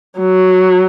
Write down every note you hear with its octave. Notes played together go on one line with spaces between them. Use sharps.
F#3